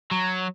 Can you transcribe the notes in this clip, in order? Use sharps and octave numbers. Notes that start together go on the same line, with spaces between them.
F#3